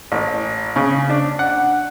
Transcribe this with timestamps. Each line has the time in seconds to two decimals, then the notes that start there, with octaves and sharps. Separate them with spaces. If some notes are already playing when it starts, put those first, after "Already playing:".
0.12 A1
0.76 C#3
1.10 D4
1.39 F#5